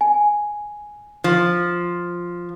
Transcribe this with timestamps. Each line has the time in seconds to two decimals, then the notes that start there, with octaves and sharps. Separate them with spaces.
0.01 G#5
1.24 F3